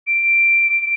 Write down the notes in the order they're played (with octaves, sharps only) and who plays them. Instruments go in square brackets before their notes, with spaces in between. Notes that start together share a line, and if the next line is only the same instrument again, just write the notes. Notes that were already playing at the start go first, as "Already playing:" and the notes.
[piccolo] D7